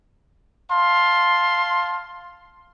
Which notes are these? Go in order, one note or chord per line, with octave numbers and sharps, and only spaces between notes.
F5 A5 C6